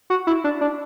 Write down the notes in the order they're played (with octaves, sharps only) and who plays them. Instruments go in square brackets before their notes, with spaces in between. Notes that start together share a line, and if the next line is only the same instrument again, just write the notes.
[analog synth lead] F#4
E4
D4
D4